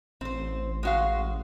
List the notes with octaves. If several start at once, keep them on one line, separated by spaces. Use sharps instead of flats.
A1 C4 C5
G#3 F#4 F5